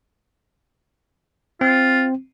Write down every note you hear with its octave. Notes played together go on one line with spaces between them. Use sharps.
C4 F4